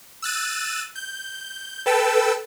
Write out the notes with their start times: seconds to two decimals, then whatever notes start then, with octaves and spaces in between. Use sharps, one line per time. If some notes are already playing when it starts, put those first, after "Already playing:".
0.22 E6 F#6 A6 D#7
0.96 G6
1.86 A4 B4 G5 A5 E6